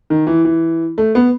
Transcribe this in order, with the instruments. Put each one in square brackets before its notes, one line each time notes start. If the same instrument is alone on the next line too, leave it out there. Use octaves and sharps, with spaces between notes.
[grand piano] D#3
E3
E3
A3
B3